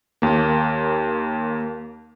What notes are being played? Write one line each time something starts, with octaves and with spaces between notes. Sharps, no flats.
D#2 A#3